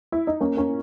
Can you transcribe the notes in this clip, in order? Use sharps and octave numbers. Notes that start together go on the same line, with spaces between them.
E4
D#4
A#3 C#4
A#3 C#4